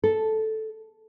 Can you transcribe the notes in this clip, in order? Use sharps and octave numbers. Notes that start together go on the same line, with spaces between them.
A4